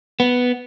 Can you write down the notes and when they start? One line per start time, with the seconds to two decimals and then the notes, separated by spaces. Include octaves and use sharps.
0.20 B3